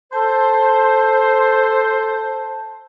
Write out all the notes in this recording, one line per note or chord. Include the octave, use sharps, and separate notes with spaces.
A4 C5 A5